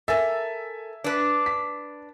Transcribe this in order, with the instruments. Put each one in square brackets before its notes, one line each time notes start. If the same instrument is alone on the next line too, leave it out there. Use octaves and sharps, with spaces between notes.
[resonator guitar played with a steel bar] A4 A#4 [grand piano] E5 G#5
[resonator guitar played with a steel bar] D4 B4
[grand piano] B6